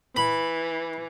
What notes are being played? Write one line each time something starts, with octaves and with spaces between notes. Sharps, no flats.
E3 B5